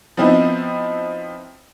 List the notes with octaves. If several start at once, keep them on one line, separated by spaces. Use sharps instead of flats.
F3 B3 C4 D#4 E4